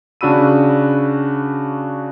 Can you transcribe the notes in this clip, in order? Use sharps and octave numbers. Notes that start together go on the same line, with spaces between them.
C#3 D4 F#4 B5 E6 D#7